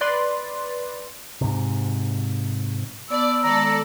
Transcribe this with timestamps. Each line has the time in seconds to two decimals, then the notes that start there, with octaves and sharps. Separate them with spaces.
0.01 B4 D5 C6
1.41 G#2 C3
3.10 B3 D5 A5 B5 E6
3.44 D#3 G#3 A4 D5 A#5